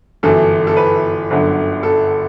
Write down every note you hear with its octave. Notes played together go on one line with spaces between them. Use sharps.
G1 F#2 E3 A4
A4
B4
G1 F#2 D3 F#3
A4